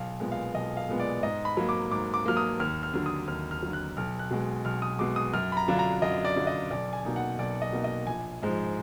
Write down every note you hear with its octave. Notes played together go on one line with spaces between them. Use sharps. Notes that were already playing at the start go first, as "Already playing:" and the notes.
Already playing: B1 F5
A#2 G#3 B3
F5
B1 D#5
F5
A#2 G#3 B3
D5
G#2 D#5
B5
F#3 A#3
D6
G#2 D6
D6
F#3 A#3 F6
D#6
D#2 F6
F6
D3 F#3
D#6
D#2 F6
F6
D3 F#3
F#6
B1 F6
F#6
B2 G#3
B1 F6
D#6
B2 G#3 D6
D#6
F#2 F6
B5
A#5
D3 F#3 D4 F4
A#5
F#2 D#5
D5
D3 F#3 D4 F4
D#5
B1 D5
G#5
B2 A#3 D#4
F#5
B1 D5
D#5
B2 A#3 D#4
D#5
A#1 G#5
G#2 F3 G#3